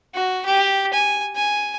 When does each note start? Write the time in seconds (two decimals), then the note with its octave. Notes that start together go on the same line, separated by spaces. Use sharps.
0.14 F#4
0.46 G4
0.94 G#5
1.36 G#5